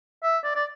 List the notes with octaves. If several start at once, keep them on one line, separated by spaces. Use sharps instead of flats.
E5
D5
D5